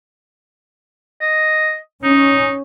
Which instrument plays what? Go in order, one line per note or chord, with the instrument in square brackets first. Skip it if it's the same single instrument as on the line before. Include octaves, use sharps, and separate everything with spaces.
[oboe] D#5
[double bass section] C#4 [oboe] D#4